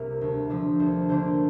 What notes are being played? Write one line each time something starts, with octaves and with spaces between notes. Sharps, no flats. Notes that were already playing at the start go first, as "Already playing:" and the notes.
Already playing: C2 C3 A#3 A#4
D2
C3 F3 D4
D2 C5
D3 A#3 D4 C5